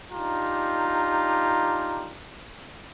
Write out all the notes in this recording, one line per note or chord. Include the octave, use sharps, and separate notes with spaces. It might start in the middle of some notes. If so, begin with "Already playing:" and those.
D4 D#4 F4 G4 A#5